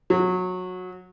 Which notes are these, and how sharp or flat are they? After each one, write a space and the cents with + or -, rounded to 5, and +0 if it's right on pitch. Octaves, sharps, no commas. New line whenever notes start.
F#3 -20